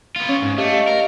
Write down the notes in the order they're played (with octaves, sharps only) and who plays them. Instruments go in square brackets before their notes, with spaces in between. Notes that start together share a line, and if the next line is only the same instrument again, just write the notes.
[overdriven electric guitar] B3 F4
[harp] C#4
[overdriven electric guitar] G#2
[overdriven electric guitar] A3 [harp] G4 D#5 F5
[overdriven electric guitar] A#4